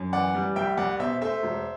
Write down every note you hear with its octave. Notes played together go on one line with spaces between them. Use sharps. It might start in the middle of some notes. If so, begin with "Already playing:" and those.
Already playing: F#2
E3 D5 F#5
G3
C2 E5 G5
C2 D5 F#5
B2 C5 E5
A3 C5 E5
E1